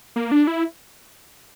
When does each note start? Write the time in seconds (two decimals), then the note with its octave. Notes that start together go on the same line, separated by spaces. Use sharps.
0.16 A#3
0.32 D4
0.47 E4